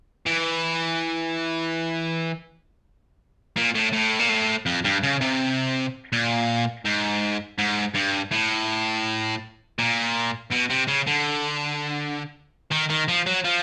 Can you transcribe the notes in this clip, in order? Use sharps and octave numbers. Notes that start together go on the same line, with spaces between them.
E3
A#2
A2
A2
A#2
A2
F2
G2
C#3
C3
A#2
G#2
G#2
G2
A2
A#2
B2
C3
C#3
D3
D#3
D#3
F3
F#3
F3